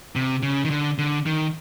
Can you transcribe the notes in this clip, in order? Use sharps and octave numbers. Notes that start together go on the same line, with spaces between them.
C3
C#3
D#3
D3
D3
D#3